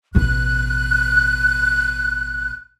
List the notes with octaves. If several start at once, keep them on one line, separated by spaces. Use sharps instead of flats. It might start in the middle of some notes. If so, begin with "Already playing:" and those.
A1 B2 F#6